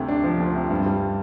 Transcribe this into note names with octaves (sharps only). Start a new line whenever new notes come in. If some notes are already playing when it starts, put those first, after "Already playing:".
Already playing: D2 C3
D4
F3
D2
C3
G2
G3